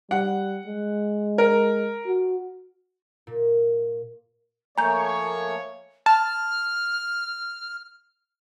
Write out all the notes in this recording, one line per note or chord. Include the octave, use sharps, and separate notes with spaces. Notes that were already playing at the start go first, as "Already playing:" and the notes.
G3 F#5
G#3
A#4
F#4
A#2
F3 A3 A#3 C#5 G#5 A#5 G6
A5 F6